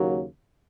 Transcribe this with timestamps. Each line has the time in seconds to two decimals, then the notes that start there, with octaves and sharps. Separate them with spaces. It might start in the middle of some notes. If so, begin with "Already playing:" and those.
Already playing: D#2 C#3 F#3 A#3